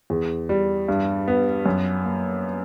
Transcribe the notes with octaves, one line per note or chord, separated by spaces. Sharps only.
E2
G3
G2
B3
F#2
A#3